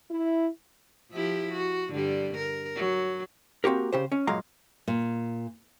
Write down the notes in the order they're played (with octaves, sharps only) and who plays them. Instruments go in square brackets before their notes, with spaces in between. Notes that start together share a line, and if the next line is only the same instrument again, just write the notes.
[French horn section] E4
[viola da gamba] F3 E4 G4
F#4
G2 D3 G3
A#4
F#3
[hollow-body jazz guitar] A#3 C4 F#4 G4 A#4
C#3 G4 C5
C#4
G2 A#2 F#3 G#3 F5 A#5
[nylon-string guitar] A#2